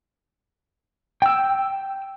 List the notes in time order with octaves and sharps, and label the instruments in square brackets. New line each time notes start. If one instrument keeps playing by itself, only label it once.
[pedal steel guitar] G5 E6